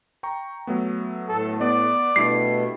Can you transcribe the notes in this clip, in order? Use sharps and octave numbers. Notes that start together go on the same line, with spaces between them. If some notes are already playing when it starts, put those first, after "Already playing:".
G5 A#5 C#6
F#3 A3 B3
A2 A4
B3 D5
B2 G3 A3 D4 E4 C7